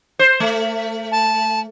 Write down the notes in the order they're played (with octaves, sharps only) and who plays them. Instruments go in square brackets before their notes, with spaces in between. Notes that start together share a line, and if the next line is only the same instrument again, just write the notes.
[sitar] C5
A3
[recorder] A5